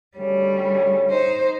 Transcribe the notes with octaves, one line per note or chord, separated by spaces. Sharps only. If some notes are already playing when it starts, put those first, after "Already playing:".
D2 C#3 G3 C#5
D#4 C5